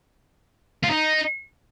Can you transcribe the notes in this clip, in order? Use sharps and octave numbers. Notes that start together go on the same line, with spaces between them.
F4
D#4